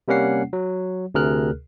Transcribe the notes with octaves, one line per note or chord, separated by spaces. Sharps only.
C3 G3 A#3 C#4 F#5 C7
F#3
D2 C3 G#4 A#4 F6 F#6